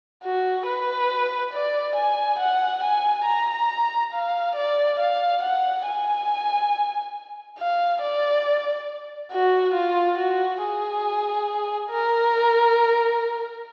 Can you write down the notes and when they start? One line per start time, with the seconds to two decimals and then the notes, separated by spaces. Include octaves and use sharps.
0.23 F#4
0.66 B4
1.53 D5
1.95 G#5
2.39 F#5
2.83 G#5
3.25 A#5
4.12 F5
4.55 D5
4.99 F5
5.42 F#5
5.85 G#5
7.58 F5
8.01 D5
9.31 F#4
9.74 F4
10.17 F#4
10.61 G#4
11.90 A#4